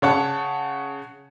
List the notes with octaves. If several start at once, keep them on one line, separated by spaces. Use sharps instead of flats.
C#3 C#5 F#5 A5